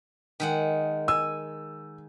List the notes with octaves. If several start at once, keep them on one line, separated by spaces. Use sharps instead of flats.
D#3 G#3 F#5
G#5 E6